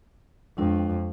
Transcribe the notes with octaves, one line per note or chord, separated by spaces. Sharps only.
F2 G#3 D4 G5